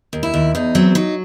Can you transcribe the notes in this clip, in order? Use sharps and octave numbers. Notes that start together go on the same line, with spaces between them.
D#2
E4
D#2
E2 D#4
F#3 C4
F#3 D#4